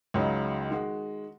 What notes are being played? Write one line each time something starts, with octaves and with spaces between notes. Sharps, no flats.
C#2 C#3 F#3 D#4
D#3 G#3 F#4